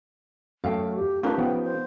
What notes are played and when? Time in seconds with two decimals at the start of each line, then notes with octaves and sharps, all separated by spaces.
0.64 F#2 A3 F5 G5
0.82 F#4
0.96 G4
1.23 A3 C#4 D#4 F4 G4 A#4 B4
1.38 F3 B3 G5
1.63 C5